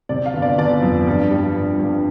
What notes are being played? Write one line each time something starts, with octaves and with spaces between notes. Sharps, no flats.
C3 D5
F5
G1
D5
G1 D5
F2
G2
G3
G2
G2